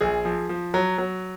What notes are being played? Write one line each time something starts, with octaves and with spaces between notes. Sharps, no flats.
A#1 G#4
F3
F3
F#3
F#3